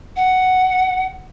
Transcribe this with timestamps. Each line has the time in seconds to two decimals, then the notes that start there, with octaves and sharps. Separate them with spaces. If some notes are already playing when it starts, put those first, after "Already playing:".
0.16 F#5